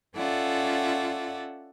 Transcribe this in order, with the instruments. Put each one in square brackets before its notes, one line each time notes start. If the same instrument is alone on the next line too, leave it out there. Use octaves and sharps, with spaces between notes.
[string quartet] C#4 F4 A4 D5 E5 F#5